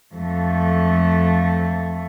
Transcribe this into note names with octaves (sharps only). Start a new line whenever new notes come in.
F2 A3